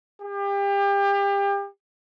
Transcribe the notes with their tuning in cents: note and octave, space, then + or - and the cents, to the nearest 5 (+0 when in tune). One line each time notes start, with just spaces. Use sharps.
G4 +30